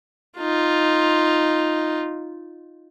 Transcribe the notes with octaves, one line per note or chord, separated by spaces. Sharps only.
D#4 F4